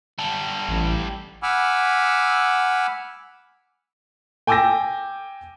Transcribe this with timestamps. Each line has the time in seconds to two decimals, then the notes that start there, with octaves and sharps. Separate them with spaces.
0.19 G3 A4
0.69 A1
1.43 F#5 G#5 B5 D6 E6 F6
4.47 G5 G#5 D6 E6 G6 A#6